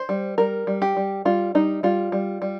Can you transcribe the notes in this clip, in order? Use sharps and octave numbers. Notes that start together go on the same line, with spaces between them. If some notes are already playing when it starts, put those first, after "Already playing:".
Already playing: C5
G3
G3 A#4
G3
G4
G3
G3 F4
G3 D#4
G3 F4
G3
G3